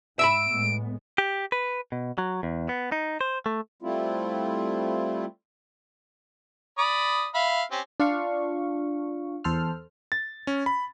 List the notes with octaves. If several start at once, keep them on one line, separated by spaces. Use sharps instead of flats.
G#2 E5 A#5 B5 E6 D7
A2 G#3 B3
G4
B4
B2
F#3
E2
B3
D#4
C5
A3
G3 A3 C4 E4 F4
D5 B5 D#6
E5 F5 B5
C4 C#4 G4
D4 F4 F5 C#6
E2 A4 C5 F6
A6
C#4
B5